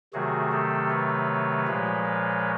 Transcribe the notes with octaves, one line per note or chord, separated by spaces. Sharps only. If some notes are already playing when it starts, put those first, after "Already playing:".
C3 D#3 F#3 A3 F#4 G#4
G4 A4
B4 C#5
A#2 F3 G#3